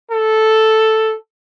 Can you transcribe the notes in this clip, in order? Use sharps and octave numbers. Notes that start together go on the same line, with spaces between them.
A4